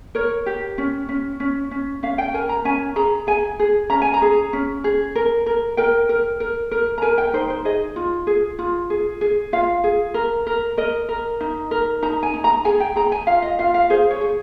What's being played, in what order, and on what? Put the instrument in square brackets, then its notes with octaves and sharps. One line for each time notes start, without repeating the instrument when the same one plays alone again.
[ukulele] A#4 C#5
G4
C#4
C#4
C#4
C#4
C#4 F5
G5
A#4 G#5
A#5
C#4 G#5
G#4 A#5
G#4 G#5
G#4
C#4 A#5
G#5
A#5
G#4
C#4
G#4
A#4
A#4
A#4 G5
A#4
A#4
A#4
A#5
A#4 G#5
G5
D#4 C5
C5
G#4 D#5
F4
G#4
F4
G#4
G#4
F4 F5
G#4
A#4
A#4
A#4 D#5
A#4
D#4
A#4
D#4 A#5
G#5
D#4
A#5
G#4 G#5
G5
G#4 A#5
G#5
F4 F5
D#5
F4 F5
F5
G#4 C5
C#5
G#4